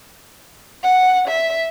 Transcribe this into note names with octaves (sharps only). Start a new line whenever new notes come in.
F#5
E5